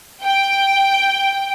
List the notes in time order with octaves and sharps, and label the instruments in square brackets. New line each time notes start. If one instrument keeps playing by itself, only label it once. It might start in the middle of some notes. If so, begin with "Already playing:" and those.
[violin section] G5